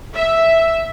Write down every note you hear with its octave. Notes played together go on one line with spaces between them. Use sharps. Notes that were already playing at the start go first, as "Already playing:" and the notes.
E5